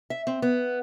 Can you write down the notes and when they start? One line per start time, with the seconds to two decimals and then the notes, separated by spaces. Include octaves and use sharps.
0.10 E5
0.27 C4
0.42 B3